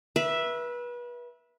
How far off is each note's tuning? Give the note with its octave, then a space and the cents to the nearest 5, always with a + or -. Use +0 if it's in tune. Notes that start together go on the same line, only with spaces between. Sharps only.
B4 -30 E5 +0